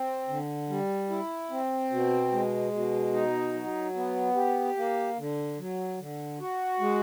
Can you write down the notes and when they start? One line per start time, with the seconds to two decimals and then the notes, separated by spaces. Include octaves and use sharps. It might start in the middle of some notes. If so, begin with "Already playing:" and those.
Already playing: C4
0.28 D3
0.69 G3
1.09 E4
1.50 C4
1.91 B2
2.32 G#3
2.72 B2
3.13 D#4
3.54 F#3
3.95 B3
4.35 G4
4.77 A#3
5.18 D3
5.58 F#3
5.98 D3
6.40 F#4
6.80 G#3